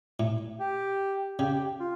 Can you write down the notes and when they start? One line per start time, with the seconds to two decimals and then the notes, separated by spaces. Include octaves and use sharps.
0.20 A2
0.60 G4
1.39 C#3 G4
1.53 G4
1.80 F4